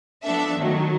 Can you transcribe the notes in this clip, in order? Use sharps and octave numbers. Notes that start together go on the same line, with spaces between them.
F3 B3 D4 A4 E5
D#3 F#3 A3